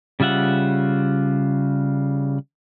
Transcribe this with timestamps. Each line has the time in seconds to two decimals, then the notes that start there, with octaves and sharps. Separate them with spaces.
0.20 C#3 G3 F4 E5 F#5